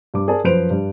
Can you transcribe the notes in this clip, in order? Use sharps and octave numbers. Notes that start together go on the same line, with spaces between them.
G2 D6
G#4 A#4 D5 A5
F#2 F3 B4 C5 D7 F7
G2